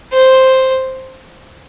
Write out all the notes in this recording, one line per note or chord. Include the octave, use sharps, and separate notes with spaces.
C5